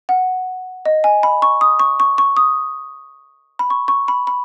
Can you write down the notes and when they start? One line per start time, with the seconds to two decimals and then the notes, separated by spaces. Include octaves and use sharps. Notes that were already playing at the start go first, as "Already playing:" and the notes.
0.09 F#5
0.85 D#5
1.04 G#5
1.23 B5
1.42 C#6
1.61 D#6
1.79 C#6
2.00 C#6
2.18 C#6
2.37 D#6
3.59 B5
3.70 C#6
3.88 C#6
4.08 B5
4.27 B5